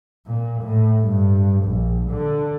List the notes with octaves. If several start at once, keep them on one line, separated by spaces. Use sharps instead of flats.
A#2
A2
G2
A#1
D3